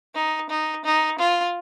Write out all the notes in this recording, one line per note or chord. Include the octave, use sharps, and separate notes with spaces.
D#4
D#4
D#4
F4